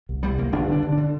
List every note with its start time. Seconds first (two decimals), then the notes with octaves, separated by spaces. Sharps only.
0.09 C2
0.23 C2 G3
0.38 C2 A#3
0.52 G1 D4
0.68 D3 D4
0.82 D3
0.92 D4
0.97 D3